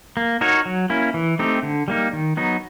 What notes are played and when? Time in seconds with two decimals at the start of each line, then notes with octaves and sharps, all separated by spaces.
0.17 A#3
0.41 D#4 F#4 A#4 C#5
0.66 F#3
0.90 A#3 C#4 E4
1.14 E3
1.39 A3 C4 D#4 G4
1.63 D3
1.88 G3 A#3 D#4
2.13 D#3
2.37 F#3 B3 D#4